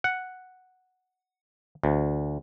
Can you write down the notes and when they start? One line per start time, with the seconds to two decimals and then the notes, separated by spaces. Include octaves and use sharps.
0.04 F#5
1.84 D2